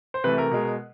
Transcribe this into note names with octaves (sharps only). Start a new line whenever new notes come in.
C5
C3 E3 A3 B4
A#4
B2 G#3